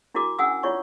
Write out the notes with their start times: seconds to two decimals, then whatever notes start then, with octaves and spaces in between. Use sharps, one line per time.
0.15 D4 E4 F#4 A#4 D6
0.39 C#4 D4 F#5 G#5 D#6 E6
0.63 E4 F4 C#5 D5 C#6